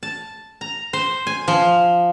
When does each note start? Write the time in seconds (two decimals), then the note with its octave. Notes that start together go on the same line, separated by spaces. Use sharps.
0.03 A5
0.61 A#5
0.93 C5
1.27 G#5
1.48 F3